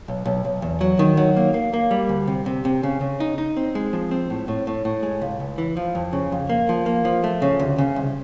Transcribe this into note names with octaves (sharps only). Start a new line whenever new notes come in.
B1
B1
B1
E2
F#3
D#3
F#3
A#3
A#3
A#3
G3
D2
C3
C3
C3
C#3
C#3
D#4
D#4
C4
G#3
F3
C4
A2
A2
A2
A2
G#3
C#2
C#2
E3
F3
F2
C#3
F2
A#3
F3
A#3
F3
A3
C#3
D2
C#3
C2